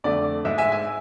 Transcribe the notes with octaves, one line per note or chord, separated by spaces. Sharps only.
F2 D3 A3 D5
G#2 G#3 E5
E5 G#5
E5 G#5